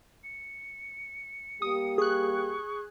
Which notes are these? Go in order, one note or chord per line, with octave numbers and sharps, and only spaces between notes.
C#7
G3 A#3 G4 D#6
G#4 C#6 F#6